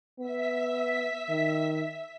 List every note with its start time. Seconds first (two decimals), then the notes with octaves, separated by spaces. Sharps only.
0.19 B3 E5 B6
1.29 D#3